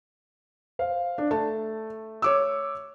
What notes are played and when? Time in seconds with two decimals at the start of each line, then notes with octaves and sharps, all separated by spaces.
0.79 C5 F5
1.18 D4
1.31 A3 A5
2.22 C#5 D6 E6